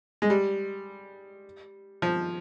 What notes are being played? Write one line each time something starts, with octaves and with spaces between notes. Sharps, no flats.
G#3
G3
F3